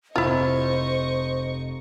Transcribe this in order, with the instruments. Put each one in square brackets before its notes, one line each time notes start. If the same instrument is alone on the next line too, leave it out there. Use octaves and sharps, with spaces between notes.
[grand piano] F1 A#5 [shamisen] E4 F4 [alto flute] C5 [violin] D#5 C#6